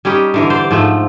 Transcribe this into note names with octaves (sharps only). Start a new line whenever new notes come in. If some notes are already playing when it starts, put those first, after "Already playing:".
G3 C#4 D#4 G4
D3 E3 A#4
C5 D5
G#2 F3 A3